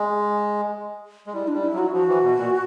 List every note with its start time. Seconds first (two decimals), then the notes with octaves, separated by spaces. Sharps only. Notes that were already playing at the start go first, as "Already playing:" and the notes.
Already playing: G#3
1.27 G#3
1.33 G3 E4
1.48 D4
1.53 G3
1.64 E4
1.73 F#3 F#4
1.93 F3 F#4
2.08 E3
2.23 B2
2.38 A#2